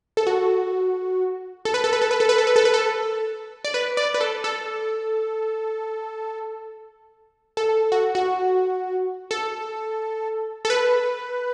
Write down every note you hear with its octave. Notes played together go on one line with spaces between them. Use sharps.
A4
F#4
A4
B4
A4
B4
A4
B4
A4
B4
A4
B4
A4
B4
A4
D5
B4
D5
B4
A4
A4
A4
F#4
F#4
A4
A4
B4